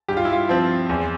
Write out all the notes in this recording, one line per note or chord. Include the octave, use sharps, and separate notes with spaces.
G2 G4
F4
E4
F4
F3 C4
E2